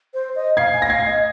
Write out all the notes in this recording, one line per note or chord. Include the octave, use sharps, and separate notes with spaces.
C5
D#5
F5 G#6 C7
G#5
A#6
G#5
F5 G#6 C7
D#5